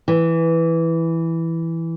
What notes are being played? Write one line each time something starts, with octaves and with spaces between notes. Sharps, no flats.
E3